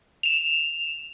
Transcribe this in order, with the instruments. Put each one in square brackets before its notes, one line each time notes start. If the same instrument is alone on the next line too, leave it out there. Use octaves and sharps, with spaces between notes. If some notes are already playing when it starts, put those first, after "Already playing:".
[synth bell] E7 F7